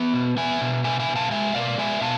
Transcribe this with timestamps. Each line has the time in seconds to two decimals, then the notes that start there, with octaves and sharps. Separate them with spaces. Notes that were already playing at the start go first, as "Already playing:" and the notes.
Already playing: B3 E5 G#5
0.14 B2
0.37 B3 E5 G#5
0.61 B2
0.84 A3 E5 G#5
1.00 E5 G#5
1.09 B2
1.16 F5 A5
1.31 G#3 E5 G#5
1.55 B2 D5 F5
1.78 G#3 E5 G#5
2.01 B2 F5 A5